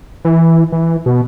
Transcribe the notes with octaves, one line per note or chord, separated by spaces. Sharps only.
E3
E3
B2